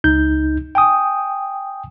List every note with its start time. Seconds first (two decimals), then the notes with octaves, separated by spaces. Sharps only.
0.04 C#2 D#4 G6
0.75 G5 G#5 D#6